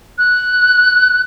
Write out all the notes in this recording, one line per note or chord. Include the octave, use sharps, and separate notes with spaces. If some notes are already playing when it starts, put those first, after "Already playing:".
F#6